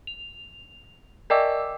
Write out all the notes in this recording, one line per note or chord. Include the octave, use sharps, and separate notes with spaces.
F7
A#4 D5 D#5 G5 D6 E6